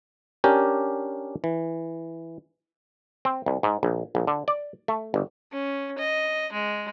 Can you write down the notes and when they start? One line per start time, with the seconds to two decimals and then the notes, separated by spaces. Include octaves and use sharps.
0.44 C#4 D4 G4 A#4 G#5
1.44 E3
3.25 C4
3.46 C2
3.63 G#2
3.83 A#1
4.15 A#1
4.27 D3
4.48 D5
4.88 A3
5.14 G1
5.52 C#4
5.98 D#5
6.53 G#3